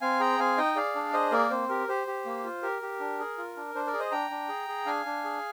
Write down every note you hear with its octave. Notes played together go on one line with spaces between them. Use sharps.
C4 F5 G#5
G#4 G5 A#5
C4 F5 G#5
D#4 D#5 G5
G#4 D5 F5
D4
G#4 C5 D#5
A#3 A#4 D5
C4 C5
G4 A#4
G4 C5
G4
A#3
F4
G4 A#4
G4
D4
G#4
F4
D4
D4 C5
A#4 D5
G#4
C5 D#5
D4 G5 A#5
D4
G#4
G#4
D4 F5 G#5
D4
G#4